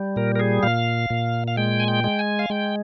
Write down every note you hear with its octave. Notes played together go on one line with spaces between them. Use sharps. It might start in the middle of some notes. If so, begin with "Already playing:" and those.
Already playing: G3
A#2 A#4
A#4
G#4
A#2 F5
A#2
F5
G#3 G5
G#5
G5
G#3
G#5
F5
G#3 G5